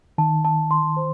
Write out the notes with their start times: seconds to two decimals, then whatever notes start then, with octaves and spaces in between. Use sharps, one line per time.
0.18 D#3 A5
0.45 A5
0.71 C6
0.97 C5